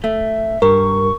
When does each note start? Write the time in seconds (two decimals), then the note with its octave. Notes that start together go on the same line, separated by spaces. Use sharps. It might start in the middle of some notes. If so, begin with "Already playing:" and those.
0.04 A3 E5
0.62 G2 A#4 C#6